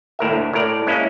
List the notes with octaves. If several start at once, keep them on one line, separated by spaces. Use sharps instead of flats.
D#2 A2 A#4 E5
D2
A2 A#4 D5
G#3 A#3 C#4 E4